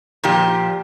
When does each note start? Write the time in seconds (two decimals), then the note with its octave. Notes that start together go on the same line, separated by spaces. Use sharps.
0.24 A#2 F3 G4